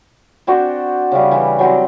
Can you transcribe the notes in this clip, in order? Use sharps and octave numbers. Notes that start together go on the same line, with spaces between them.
C4 D4 F#4 C5
C#3 G3
E3
F#3 G3 C4